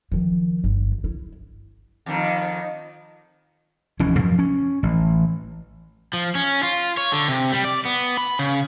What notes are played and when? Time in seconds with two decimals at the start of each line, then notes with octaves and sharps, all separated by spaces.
0.12 D#3 F3
0.64 G1
1.04 E4
2.06 F2 D#3
3.99 F1 D#2 E3 C#4
4.19 F#2 F3
4.39 C#4
4.83 A1
6.13 F3
6.35 C#4
6.63 F4
6.97 C#5
7.12 D3
7.28 C3
7.52 G3
7.65 D5
7.85 B3
8.18 B5
8.39 C#3